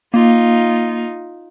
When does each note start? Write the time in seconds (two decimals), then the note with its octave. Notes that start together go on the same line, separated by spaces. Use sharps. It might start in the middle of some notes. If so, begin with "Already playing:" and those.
0.14 A#3 D#4 F4